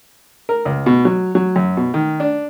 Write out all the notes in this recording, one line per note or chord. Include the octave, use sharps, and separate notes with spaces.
A#4
C#2
B2
F#3
F#3
F#2
B2
D#3
D4